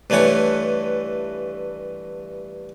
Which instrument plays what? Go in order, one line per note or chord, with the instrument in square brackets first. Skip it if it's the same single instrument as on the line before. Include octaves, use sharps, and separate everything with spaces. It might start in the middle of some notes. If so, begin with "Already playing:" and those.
[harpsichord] G2 E3 A3 C#5 F#5